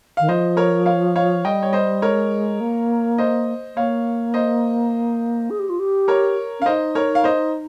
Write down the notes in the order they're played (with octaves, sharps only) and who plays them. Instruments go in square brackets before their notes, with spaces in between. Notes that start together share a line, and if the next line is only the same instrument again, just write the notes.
[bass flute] D#3 [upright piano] F5
[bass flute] F3 [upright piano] C5 D#5
[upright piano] A#4 C#5
C#5 F5
C#5 F5
[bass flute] G3 [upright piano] D#5 G5
[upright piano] C#5
C5 D#5
[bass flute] G#3 [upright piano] A#4 C#5
[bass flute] A#3
[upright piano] C5 D#5
[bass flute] A#3 [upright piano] C#5 F5
[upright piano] C5 D#5
[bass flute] G#4
G4
F4
G4
[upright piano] A#4 C#5
[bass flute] C#4 [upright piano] F5
[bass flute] D#4 [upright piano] C5 D#5
[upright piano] A#4 C#5
F5
C5 D#5